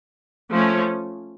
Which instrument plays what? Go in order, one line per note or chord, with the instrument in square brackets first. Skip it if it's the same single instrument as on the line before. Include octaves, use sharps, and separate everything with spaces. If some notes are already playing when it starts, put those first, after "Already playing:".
[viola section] F3 A3 C#4